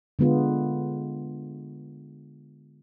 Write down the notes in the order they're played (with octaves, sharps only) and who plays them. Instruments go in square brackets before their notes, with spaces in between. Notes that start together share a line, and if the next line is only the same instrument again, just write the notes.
[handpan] D3 G#3 B3 F4